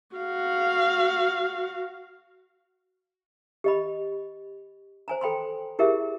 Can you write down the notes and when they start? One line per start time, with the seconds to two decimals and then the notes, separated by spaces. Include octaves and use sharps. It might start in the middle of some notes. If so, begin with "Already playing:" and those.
0.16 F#4 F5
3.64 G4 D#5 B5
5.08 C5 G#5 A#5
5.21 A4 G5 B5 C6
5.79 E4 G4 G#4 A#4 E5